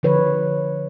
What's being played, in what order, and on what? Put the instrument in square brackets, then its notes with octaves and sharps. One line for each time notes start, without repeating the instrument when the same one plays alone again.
[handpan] D3 F3 B4 C#5